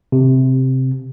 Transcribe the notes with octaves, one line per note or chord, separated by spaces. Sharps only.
C3